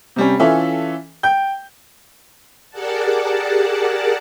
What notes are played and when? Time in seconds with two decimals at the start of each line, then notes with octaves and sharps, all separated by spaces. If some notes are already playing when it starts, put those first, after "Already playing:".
0.16 C3 G3 C#4
0.39 E3 C#4 F4 A4 E5
1.23 G5 G6
2.71 G4 G#4 A#4 D5 F#5 A5